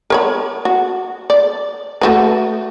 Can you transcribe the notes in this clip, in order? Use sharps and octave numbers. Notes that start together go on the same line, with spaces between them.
A#4 C#5 B5
F#4
D5
A3 F#4 B4